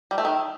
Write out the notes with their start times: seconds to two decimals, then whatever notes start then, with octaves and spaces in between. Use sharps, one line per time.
0.11 G3
0.18 A3
0.25 D#3